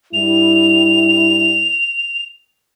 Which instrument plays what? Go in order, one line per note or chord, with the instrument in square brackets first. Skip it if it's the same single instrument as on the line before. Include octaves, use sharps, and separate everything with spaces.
[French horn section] G2 G3 E4 [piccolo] F7